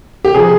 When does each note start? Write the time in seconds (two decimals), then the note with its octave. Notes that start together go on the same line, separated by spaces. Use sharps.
0.25 G4
0.34 C3 F3 G#4